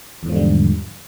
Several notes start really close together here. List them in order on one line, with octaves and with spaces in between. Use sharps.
E2 G#2 F3 D3 G3